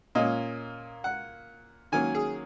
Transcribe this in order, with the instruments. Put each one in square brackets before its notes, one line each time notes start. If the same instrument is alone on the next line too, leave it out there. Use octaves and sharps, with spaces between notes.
[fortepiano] A#2 A#3 C#4 D#5
F#5
D#3 F#3 A#3 C#4 G#5
G#4